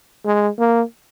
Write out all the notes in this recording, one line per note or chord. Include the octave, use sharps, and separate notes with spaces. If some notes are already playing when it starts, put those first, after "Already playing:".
G#3
A#3